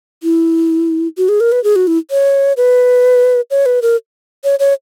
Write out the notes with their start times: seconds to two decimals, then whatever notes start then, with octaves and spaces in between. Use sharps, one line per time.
0.23 E4
1.18 F#4
1.29 G#4
1.40 A#4
1.52 B4
1.64 G#4
1.76 F#4
1.87 E4
2.11 C#5
2.57 B4
3.51 C#5
3.66 B4
3.82 A#4
4.44 C#5
4.59 C#5